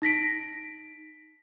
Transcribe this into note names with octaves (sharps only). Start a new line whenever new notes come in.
D#4 A#6 B6 D7